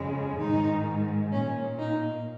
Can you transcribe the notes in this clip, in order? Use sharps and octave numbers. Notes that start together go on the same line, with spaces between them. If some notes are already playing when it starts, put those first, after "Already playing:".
Already playing: F2 C#3 G#3
G#2 D#3 G#3 D#4
A#2 A#3 C#4
D#4